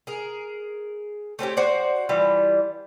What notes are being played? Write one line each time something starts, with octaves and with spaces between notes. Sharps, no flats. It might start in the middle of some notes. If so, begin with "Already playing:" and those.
G#4 A#4
A3 C4 C#4 G4
F#4 C5 D5
E3 G3 F4